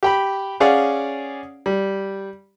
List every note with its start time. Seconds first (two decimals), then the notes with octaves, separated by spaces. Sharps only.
0.03 G4 G5 B5
0.60 C#4 G#4 D5 F5 F#5
1.66 G3